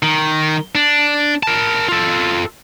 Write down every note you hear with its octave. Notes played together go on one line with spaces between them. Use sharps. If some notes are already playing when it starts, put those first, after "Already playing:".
D#3
D4
A#4 A5
F4 A4